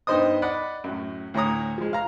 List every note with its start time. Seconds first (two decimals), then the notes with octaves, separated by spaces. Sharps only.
0.07 G2 B3 D#4 C5 D#5 D#6
0.42 D5 D#5 F#5 B5
0.84 F#2 A2
1.34 D2 A2 C#5 A#5 D#6
1.78 F3 G#3
1.93 F5 A#5